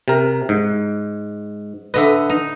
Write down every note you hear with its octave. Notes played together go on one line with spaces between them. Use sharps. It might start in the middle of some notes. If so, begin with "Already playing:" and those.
C3 A#4
G#2
D3 B4 D#5 E5
D#4